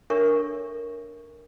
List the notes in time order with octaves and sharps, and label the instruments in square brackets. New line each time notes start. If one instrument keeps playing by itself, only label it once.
[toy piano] D4 A4 A#4 C#5 E5 C#6